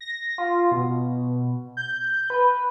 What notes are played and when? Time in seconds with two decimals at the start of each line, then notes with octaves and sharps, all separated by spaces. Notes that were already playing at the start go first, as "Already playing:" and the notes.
0.01 A#6
0.38 F4
0.72 B2
1.77 G6
2.30 B4